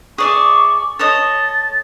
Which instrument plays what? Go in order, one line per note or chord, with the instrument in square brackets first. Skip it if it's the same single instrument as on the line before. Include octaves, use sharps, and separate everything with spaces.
[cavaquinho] G#4 D5 E5 [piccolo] C#6
[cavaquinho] A4 C#5 D#5 [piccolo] A6